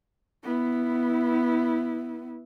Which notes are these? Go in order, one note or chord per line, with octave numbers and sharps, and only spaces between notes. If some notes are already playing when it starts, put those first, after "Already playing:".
B3 E4